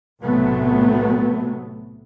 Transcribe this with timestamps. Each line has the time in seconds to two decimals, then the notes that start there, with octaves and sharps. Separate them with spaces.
0.21 B1 A2 C3 F#3 A3 B3